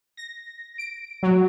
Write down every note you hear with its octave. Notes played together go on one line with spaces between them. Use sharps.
A#6
D7
F#3